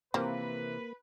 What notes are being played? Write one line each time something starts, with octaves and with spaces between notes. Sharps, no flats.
C3 E3 F3 G3 A#3 A#4 B4